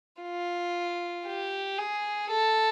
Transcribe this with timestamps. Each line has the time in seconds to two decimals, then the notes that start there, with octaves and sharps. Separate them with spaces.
0.22 F4
1.26 G4
1.79 G#4
2.31 A4